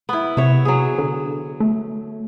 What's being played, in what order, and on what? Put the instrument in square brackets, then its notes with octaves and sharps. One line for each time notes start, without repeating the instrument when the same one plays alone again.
[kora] B3 E4
[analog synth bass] C3 [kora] C#5 E5
[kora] F#3 G#4
[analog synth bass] D3
A3